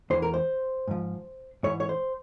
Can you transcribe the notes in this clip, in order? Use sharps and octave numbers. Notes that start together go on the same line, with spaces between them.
E2 E3 C5
A#4
C5
G#2 F3
G#2 E3 C#5
C#5
C5